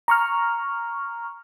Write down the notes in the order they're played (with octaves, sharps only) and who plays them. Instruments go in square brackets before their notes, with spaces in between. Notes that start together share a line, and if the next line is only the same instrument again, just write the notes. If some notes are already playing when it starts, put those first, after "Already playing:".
[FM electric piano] A#5 C#6 F6